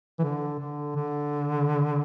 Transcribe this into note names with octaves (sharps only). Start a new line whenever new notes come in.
E3
D3
D3
D3